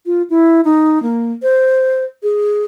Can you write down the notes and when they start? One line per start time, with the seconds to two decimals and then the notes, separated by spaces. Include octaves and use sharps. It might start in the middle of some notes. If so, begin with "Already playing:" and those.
0.06 F4
0.30 E4
0.65 D#4
1.03 A#3
1.43 C5
2.23 G#4